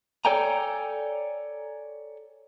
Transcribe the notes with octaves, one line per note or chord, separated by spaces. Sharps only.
A4 C#5 D5 G5 G#5 A#5